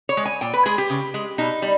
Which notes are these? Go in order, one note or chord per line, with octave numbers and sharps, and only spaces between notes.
C#5
G#3
G#5
A#2 G5
B4
G#3 G#4
G4
C#3
G#3
B2 D#4
G3